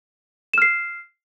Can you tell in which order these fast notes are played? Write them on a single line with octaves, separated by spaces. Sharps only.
E7 F6 C7